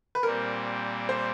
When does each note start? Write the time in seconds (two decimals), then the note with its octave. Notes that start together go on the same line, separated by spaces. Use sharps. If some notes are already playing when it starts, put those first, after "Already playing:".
0.15 B4
0.23 A#2 G3 C4 A#4
1.09 C5